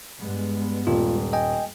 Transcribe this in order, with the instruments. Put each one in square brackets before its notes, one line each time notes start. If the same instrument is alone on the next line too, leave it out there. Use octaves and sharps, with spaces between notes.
[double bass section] G2 G#3 B3
[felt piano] D#1 [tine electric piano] F4
[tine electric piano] D#5 G5 G#5